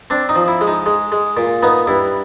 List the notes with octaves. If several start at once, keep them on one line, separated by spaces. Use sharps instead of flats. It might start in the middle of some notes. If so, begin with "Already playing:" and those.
C4 D4
D#4
F3
E4
G#3
D#4
G#3
G#3
A#2
B3 D#4
G2 E4